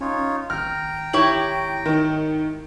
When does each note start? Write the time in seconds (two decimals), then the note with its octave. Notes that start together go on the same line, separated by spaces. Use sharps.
0.01 C#4 D#4 F4 C#5
0.50 G#1 G5 A#5 F6
1.13 E4 G4 C#5 F#7
1.86 D#3